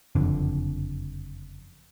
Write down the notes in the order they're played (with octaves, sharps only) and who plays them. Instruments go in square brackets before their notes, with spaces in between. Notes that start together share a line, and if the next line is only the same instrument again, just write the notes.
[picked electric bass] F#1 F2 D3